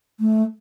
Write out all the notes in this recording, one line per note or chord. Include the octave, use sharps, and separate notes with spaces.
A3